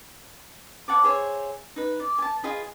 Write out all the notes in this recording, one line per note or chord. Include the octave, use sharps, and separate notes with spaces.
C#5 F#5 A5 D6
G#4 C5 C#5 E5
D#4 B4
D5
G#5 A5
F4 G#4 D#5 B5